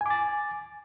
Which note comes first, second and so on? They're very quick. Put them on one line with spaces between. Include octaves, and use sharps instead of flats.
G#5 D6 A6